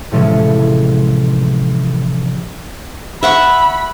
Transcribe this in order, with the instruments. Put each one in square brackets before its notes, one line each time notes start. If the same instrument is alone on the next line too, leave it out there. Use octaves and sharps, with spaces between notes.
[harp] A2 C3 E3 F3 G#3 C#4
[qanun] E5 F#5 C#6 [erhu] B5